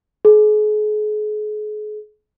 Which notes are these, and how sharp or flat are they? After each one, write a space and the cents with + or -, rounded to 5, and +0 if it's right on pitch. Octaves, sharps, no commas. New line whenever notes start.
G#4 +40